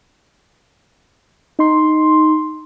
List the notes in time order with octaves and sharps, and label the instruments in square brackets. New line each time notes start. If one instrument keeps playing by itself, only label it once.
[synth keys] D#4 C6